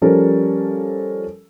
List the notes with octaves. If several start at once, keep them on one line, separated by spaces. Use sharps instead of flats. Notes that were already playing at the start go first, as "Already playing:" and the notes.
F3 G3 C#4 A4 A#4